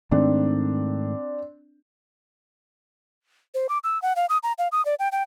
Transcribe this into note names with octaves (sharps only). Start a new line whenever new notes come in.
G#2 D#3 A3 C4 D4
C5
D6
E6
F#5
F5
D#6
A#5
F5
D#6
D5
G5
G5